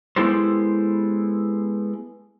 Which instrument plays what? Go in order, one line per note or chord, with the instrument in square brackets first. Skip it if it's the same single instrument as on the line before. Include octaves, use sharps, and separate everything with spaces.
[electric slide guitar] G#3 B3 E4 G4 A4 C5